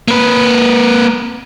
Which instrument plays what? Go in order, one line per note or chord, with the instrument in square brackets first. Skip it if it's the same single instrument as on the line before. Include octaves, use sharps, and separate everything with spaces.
[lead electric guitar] A#3 B4